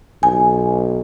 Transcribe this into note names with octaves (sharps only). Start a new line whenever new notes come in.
B1 G#5